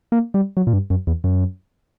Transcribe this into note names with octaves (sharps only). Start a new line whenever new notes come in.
A#3
G3
F#3
A#2
G2
F#2
E2
F#2